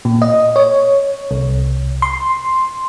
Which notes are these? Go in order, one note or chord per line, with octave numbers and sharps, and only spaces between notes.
A#2
D#5
C#5
C2
C6